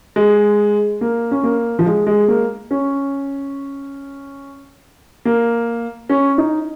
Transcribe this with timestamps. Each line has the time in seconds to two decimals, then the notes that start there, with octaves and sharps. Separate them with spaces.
0.16 G#3
1.01 A#3
1.31 C#4
1.43 A#3
1.79 F3
1.86 G#3
2.07 G#3
2.28 A#3
2.71 C#4
5.25 A#3
6.09 C#4
6.38 D#4